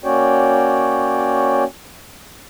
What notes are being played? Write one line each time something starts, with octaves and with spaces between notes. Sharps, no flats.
A#3 C#4 F#4 C#5 D5 G5